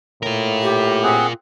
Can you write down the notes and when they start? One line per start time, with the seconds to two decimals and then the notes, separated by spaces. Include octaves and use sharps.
0.23 A2 F4 A#4
0.62 G4
1.03 C4 G#4 F#5